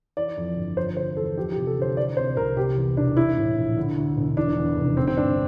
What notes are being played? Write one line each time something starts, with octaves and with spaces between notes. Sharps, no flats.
E3 D5
F2
G1
F3 C5
D3 C5
E2 A4
F3 G4
G4
C3
A4
D2 C5
E3 D5
C3 C5
C2 A#4
C3 G4
E2
E1 D4
E3 E4
A2
A#1
D3
D2
E1
E3 D4
E2
F1
D3 C4
C4
G2 D4